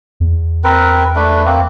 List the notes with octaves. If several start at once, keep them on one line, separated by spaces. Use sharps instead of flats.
E2
C4 A#4 B4
A3 D4 B4
A#3 C4